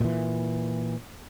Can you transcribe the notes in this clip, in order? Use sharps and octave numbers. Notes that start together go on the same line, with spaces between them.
A#2 E3